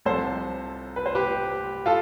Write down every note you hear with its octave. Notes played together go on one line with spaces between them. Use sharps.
C2 C3 F3 A4 C5
B4
C5
G4 B4
F4 A4